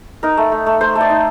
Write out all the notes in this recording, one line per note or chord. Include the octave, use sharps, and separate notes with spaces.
D#4 A#4
A3
A3
A3
A3 C5
A3
D5
D#4